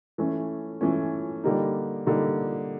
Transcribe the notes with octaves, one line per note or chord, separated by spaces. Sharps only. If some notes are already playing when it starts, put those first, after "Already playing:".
E3 A3 C#4
E3 A3 C#4
D3 G3 A#3 D#4
D3 G3 A#3 D#4